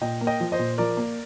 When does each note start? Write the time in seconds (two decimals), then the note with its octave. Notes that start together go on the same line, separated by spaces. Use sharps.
0.01 A#2 D#5 G5
0.21 A#3
0.27 D#5 G5
0.40 F3
0.52 C5 D#5
0.59 A#2
0.78 F3 A#4 D5
0.97 A#3